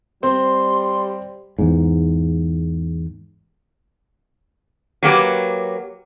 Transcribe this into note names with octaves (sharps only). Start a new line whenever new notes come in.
G3 C4 C6
E2 G#2
F#3 A#3 G4 B4